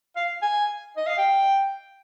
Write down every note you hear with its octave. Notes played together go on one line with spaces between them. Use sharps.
F5
G#5
D#5
F5
G5